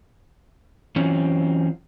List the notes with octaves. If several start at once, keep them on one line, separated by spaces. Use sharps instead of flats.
E3 F#3 C4 C#4 F4